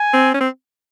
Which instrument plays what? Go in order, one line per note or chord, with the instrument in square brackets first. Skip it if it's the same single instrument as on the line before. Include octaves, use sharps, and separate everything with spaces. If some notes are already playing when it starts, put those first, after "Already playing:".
Already playing: [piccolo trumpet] G#5
[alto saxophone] C4
C#4
C4